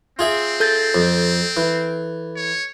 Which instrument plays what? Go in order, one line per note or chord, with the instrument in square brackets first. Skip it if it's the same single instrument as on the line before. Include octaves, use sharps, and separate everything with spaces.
[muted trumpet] C4 [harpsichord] F4 G#4 E5
[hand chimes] A4 G6 A6
[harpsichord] F2
E3
[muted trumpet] C#5